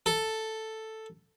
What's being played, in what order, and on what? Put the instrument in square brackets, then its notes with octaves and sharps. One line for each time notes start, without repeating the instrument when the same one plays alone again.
[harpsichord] A4